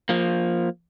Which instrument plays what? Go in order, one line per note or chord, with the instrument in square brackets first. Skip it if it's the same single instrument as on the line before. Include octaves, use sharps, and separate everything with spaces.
[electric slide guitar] F3 A#3